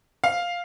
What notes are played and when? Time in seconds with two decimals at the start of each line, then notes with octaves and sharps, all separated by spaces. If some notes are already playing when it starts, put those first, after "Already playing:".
0.24 F5